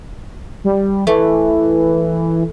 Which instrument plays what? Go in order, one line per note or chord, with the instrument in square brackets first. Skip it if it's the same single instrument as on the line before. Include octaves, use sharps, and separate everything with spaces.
[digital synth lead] G3
[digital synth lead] E3 [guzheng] A3